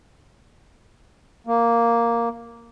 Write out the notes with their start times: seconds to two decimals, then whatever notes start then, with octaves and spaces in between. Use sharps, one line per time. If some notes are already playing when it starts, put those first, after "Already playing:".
1.47 A#3